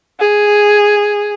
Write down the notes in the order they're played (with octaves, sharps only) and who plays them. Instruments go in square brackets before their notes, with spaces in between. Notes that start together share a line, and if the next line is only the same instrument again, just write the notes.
[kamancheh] G#4